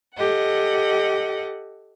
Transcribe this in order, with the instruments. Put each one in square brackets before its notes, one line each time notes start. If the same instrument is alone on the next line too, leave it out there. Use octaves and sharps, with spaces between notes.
[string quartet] G4 A4 D#5 F#5